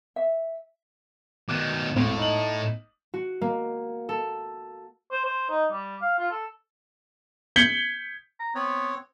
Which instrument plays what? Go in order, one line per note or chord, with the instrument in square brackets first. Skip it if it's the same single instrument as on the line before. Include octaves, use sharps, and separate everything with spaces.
[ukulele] E5
[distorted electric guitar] B2 D#3 [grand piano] D6 F#6
[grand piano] E1 C4 [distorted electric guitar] A2
[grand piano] D#4 F#7
[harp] F#4
A#3
A4
[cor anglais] C5
C5
D#4
G3
F5
F4
A4
[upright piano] G6 G#6 B6 C#7 F#7 G7
[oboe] A#5
[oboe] B3 [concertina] C4 C#5